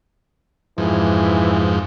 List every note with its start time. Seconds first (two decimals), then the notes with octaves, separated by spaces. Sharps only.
0.78 F2 G#2 E3